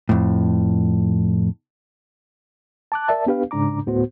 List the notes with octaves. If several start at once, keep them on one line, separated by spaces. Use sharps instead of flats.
F2 A2
A5 D6 F#6
A#4 D5 E5 A5
B3 D4 G4 B4 F5
G#2 C#3 D4 A#5 D6
D2 A2 B3 F#4 C5